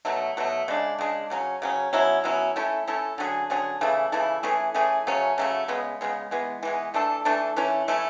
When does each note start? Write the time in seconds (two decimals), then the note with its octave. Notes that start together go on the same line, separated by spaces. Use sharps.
0.05 B2 F#3 A3
0.37 B2 F#3 A3
0.68 C#3 G#3 D4
0.98 C#3 G#3 D4
1.30 C#3 F#3 C#4
1.62 C#3 F#3 C#4
1.93 B2 F#3 C#4 E4
2.24 B2 F#3 C#4 E4
2.56 A3 C#4 E4 A4
2.87 A3 C#4 E4 A4
3.18 D3 F#3 C#4 G#4
3.50 D3 F#3 C#4 G#4
3.81 C#3 E3 A3 E4
4.12 C#3 E3 A3 E4
4.43 E3 A3 C#4 G#4
4.74 E3 A3 C#4 G#4
5.07 C#3 F#3 A3 C#4
5.38 C#3 F#3 A3 C#4
5.68 C#3 G#3 B3
6.01 C#3 G#3 B3
6.31 E3 G#3 B3
6.63 E3 G#3 B3
6.94 E3 A3 D4 A4
7.25 E3 A3 D4 A4
7.56 E3 A3 C#4 E4
7.88 E3 A3 C#4 E4